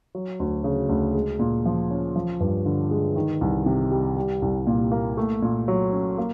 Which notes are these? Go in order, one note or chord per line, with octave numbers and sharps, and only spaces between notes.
F#3
D2
C#3
D2
G#3
A#2
F3
C#4
F3
G2
D3
G#3
D#3
C2
C3
G3
G3
C2
A#2
A#3
A3
A#2
F#3
C#4
A#3